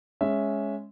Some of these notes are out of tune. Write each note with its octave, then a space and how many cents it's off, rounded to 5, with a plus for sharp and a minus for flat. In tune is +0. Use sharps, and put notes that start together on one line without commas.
G#3 +0 C#4 +0 E5 +0